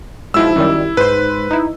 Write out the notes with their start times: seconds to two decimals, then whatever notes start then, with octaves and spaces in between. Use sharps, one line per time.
0.34 G#2 B2 F3 E4 E6
0.56 F#2 D#3 G3
0.97 G#2 B4 C5
1.51 D#4 E4